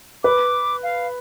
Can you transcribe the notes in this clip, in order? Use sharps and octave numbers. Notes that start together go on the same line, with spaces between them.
B4 D6
F5